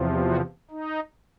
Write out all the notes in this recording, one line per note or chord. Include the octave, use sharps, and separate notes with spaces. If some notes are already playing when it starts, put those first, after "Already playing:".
Already playing: E2 C3 F3
F#4
D#4